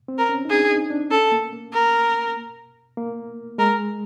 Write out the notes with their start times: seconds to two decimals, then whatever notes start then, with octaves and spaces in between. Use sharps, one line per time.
0.08 C4
0.18 A#4
0.29 C#4
0.45 D#4
0.49 D4 G#4
0.70 D#4
0.90 D4
1.10 C#4 A4
1.32 A#3
1.52 A#3
1.73 A#4
2.97 A#3
3.58 G#3 A#4